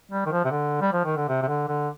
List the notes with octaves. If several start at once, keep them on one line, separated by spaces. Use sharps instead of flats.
G3
D#3
F3
C3
D3
G3
F3
D#3
D3
C3
C3
D3
D3